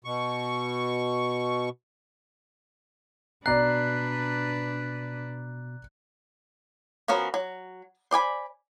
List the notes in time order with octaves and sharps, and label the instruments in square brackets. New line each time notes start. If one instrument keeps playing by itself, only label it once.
[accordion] B2 C#6
[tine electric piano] B2 C7 [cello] D4 B4 [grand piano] D5 A#5 [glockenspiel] F#6
[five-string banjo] F3 B3 C#4 F#4 A#4
F#3
C5 D5 G#5 B5